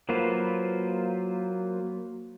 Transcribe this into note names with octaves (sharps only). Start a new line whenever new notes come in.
F#3 A#3 F4 B4 C5